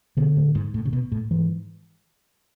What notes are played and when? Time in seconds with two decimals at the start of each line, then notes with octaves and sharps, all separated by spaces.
0.17 B2 D3
0.36 A2
0.55 G#2
0.74 A2
0.86 C#3
0.93 B2
1.12 A2
1.31 G#2 E3